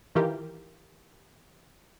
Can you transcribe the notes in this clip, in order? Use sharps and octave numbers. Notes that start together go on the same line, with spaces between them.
D#3 E3 F4 G4 A#4